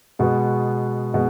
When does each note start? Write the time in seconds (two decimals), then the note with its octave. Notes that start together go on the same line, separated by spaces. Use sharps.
0.19 B2 G#3 B3 F#4
1.14 B2 G#3